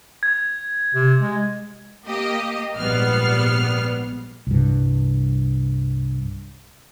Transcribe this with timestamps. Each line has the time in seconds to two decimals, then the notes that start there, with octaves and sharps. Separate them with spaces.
0.23 G#6
0.94 C3
1.20 G#3
2.06 A#3 G4 D#5
2.76 A#1 G#2 G3 B3 F6 C7
4.47 C2 G2